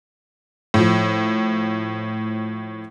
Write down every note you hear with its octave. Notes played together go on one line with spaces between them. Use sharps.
A2 F3